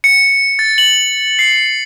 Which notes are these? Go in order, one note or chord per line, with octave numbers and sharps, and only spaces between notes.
C#7
A6
F#7
C7